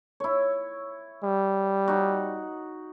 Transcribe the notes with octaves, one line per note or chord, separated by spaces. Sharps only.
E4 C#5
G3
D#4 F#4